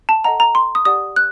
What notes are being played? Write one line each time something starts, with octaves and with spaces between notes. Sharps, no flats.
A5
A4 D#5 F#5 A#5
A#5
C6
D#6
G4 D5 F#5 D#6
F#6